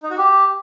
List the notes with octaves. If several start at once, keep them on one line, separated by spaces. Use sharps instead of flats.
D#4
F#4
G4